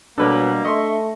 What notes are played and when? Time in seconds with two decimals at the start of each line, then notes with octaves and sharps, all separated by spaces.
0.18 B2 F#3 G3 A#3 D4 A4 B4 C#5
0.64 A3 D#5 E5 C6 C#6